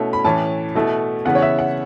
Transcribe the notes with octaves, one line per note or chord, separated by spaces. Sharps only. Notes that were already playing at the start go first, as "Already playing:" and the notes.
Already playing: B2 A3 C#4 E4
B5
A2 E3 C#4 A5
B2 A3 E4
C#3 E3 B3 F#5
C#5
E5
F#5